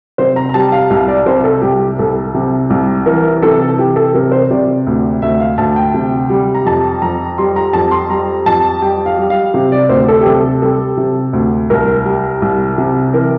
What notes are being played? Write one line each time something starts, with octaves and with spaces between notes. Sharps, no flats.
C3 C5
A#5
A#5
G3 A5
F5
C2 F5
D5
C3 C5
A4
C2 G4
C2 A4
C3
C2
E3 A#4
C3 A4
E3 G4
A4
C3 A#4
C5
C3 D5
D2
D2 E5
F5
D2 A5
G5
C3
G3
A#5
F2 A5
F2 A#5
G3 C6
A#5
F2 A5
C6
G3 A#5
F2 A5
G3 G5
F5
G3
F5
C3
D5
D2 C5
A4
G4
C3 A4
G3 A4
C3
D2
C2 A#4
G3
C2
C3
E3 A#4